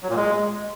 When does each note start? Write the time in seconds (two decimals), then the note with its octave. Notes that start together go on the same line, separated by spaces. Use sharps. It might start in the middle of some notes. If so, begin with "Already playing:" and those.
0.03 F#3
0.09 A#2
0.16 G#3